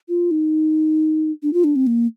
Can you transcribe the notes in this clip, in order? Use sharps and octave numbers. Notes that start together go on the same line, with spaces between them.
F4
D#4
D4
F4
D4
C4
A#3